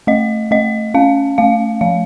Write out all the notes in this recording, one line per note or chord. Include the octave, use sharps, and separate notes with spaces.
A3 D#5
A3 D#5
C#4 F5
A3 F5
F3 F5